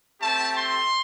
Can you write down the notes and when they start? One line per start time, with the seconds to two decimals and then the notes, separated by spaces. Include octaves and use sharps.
0.20 A3 C4 G4 A5
0.57 C6